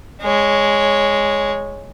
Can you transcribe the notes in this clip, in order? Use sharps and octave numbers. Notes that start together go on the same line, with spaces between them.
G#3 C#5